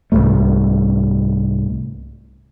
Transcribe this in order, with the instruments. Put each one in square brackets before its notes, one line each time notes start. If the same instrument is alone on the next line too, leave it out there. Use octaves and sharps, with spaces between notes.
[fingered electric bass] C2 F2 G#2 A3